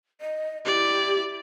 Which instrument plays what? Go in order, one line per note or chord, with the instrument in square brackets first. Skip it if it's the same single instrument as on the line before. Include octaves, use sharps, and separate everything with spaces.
[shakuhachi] D#5
[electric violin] E4 D5 [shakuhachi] G4